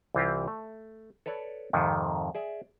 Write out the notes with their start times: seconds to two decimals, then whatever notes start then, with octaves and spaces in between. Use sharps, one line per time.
0.15 C2 E3 C4 F4 G4
0.48 A3
1.26 A4 B4 C#5 D5
1.73 F2 G#2 C3 D#3
2.35 G#4 D5 E5